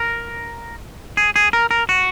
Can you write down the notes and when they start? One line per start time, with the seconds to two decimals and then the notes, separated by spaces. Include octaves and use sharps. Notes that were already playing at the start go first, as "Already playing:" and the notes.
Already playing: A#4
1.17 G#4
1.36 G#4
1.53 A#4
1.71 A#4
1.89 F#4